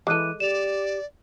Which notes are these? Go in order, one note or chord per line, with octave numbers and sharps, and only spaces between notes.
E3 G#3 A4 D6 F#6 D#7
G4 D5 E7 F7